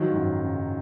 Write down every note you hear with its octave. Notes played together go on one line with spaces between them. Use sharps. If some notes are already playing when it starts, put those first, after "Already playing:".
Already playing: D#2 D#3 F3 F#3
G#2
F#2
C#3